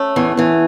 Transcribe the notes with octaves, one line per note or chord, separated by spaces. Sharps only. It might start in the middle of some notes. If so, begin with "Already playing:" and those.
Already playing: A3 C#4
E2 E3
E2 E3